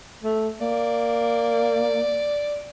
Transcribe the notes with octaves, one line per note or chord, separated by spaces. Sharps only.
A3
A#3 D5